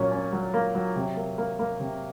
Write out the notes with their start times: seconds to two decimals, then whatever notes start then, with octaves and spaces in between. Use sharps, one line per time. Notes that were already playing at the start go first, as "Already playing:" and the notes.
Already playing: A#2 F#3 A#3 C#4
0.12 C#4
0.33 F#3
0.54 A#3
0.75 F#3
0.96 C3
1.17 A#3
1.38 A#3
1.59 A#3
1.80 C3